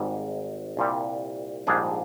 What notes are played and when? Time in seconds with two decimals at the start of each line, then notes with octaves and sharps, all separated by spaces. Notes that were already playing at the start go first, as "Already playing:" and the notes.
Already playing: G#1 G#2 G3
0.77 C2 A#2 G3
1.67 A#1 G#2 G3 D4 G#4